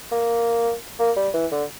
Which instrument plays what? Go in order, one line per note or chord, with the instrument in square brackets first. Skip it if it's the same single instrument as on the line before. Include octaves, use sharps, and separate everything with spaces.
[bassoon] A#3
A#3
G3
E3
D3